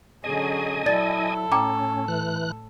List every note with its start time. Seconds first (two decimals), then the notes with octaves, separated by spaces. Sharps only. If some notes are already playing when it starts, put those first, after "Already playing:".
0.24 D3 F#3 C#4 G#4 D#5 G#5
0.86 F#3 E4 A4 D5 A6
1.52 A2 C#4 G5 A#5 D6
2.08 E3 F#6